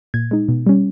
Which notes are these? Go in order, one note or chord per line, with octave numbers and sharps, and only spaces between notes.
A#2 G#6
G#3 D#4
B2
G3 C#4